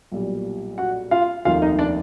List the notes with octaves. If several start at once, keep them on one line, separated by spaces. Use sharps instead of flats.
B1 A#2 G3
F#4 F#5
F4 F5
F1 D#2 D#3 F4 F5
D#4 D#5
D4 D5